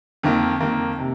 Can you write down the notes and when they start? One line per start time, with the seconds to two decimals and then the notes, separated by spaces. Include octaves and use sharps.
0.23 F2 D#3 A#3
0.60 F2 D#3 A#3
0.99 C3